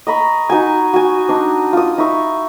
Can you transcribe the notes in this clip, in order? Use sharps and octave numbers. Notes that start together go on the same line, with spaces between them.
D#5 A#5 B5 C#6
D#4 F#4 G#5
F#4 G#5
D4 D#4
F4 D#6
D#4 E4 C#6